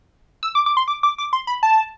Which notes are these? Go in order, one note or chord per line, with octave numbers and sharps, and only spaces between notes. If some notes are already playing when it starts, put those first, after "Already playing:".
E6
D6
D6
C6
D6
D6
D6
C6
B5
A5